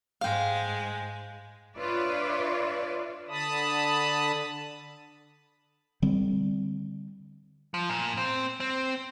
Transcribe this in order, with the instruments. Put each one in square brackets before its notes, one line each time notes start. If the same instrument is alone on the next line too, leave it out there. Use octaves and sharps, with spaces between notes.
[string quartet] G#2 G#3 [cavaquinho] F5 G5
[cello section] D4 F4 B4 C#5 D5 E5
[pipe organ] D3 A5 B5 D#6
[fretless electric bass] D3 G3 C4
[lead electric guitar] F3
A#2
C4
C4